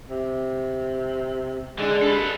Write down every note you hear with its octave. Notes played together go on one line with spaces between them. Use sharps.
C3
D3 G#3 D4
A4 B4